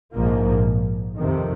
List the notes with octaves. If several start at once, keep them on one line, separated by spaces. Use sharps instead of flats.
A#1 G#2 F3 A#3
F2 C3 D#3